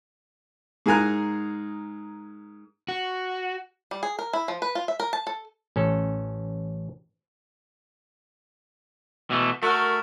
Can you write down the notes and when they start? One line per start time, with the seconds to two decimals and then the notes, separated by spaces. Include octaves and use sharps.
0.86 G#2 G#4 A#4 G#5 A#5 F#6
2.88 F#4
3.91 G3
4.03 G#4
4.19 A#4
4.33 E4
4.48 F3
4.62 B4
4.75 F4
4.88 E5
5.00 A#4
5.13 A5
5.27 A4
5.76 A1 C#4 A4
9.30 B2 E3 A3
9.63 A3 F#4 A#4